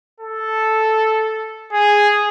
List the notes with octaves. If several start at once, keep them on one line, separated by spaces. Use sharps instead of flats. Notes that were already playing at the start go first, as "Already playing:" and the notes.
A4
G#4